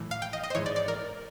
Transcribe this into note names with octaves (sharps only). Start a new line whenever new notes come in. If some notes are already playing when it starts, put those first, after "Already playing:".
Already playing: A2 E3
F5
G5
D#5
D#5
C5
G#2 E3 C#5
D5
D5
A#4